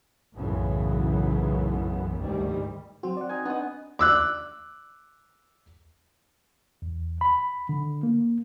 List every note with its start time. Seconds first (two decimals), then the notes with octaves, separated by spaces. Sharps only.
0.35 B1 F#2 A2 C#3 E3 B3
2.19 G1 D2 G#2 D#3 G3
3.03 F#3 C4 F#4
3.17 D5 F#5
3.29 D#4 G#5
3.45 B3 D4 D#5 D#6
3.99 D6 E6 F#6
6.82 E2
7.21 B5
7.69 D3
8.03 A#3